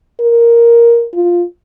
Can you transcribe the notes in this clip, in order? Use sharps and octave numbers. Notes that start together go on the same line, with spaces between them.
A#4
F4